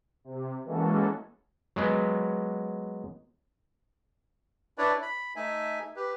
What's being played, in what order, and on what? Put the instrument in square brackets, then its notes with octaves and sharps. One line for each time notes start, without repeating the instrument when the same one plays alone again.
[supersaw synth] C3
E3 G#3 A#3 C#4 F#4 A4
[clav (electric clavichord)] F#3 G#3 B3
[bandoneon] D4 E4 B4 C#5 D5
B5
A3 D#4 E5 G#5
G4 B4